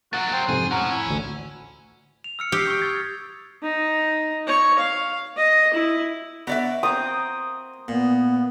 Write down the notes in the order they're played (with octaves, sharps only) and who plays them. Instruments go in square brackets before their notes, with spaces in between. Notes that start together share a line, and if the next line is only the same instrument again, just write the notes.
[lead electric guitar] F#3 A#3 [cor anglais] F#4 [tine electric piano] A6
[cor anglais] C5 [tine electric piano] G5
[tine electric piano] F2 G#2 C3 [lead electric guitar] G#4
[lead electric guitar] A2 [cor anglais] C#4 [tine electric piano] F#5 A#5
[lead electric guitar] C#4 [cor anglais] E4
[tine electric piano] A1 D2
[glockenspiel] F7
E6 F6 C#7
[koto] G4 [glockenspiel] D#6 E6 C7
[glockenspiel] C#6 E6 G6
G#6 A6
[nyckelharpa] D#4
C#5
F5
D#5
E4
[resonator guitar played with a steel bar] B3 D5 E5 [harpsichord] F#4
[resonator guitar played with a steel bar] A#3 C4 [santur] D#6
[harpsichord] A#2 [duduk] B3